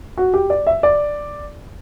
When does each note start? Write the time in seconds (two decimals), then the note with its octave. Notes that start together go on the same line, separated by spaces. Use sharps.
0.18 F#4
0.34 G4
0.50 D5
0.67 E5
0.83 D5